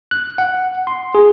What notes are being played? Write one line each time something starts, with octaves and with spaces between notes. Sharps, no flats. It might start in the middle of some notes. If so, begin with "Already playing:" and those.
F#6
F#5
C6
G#4